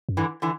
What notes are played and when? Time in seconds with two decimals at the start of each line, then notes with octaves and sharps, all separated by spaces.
0.09 F#2
0.17 G2 D3 E3
0.42 D3 E3